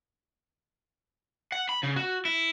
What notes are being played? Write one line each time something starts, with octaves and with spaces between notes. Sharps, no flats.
F#5
B5
C#3
F#4
E4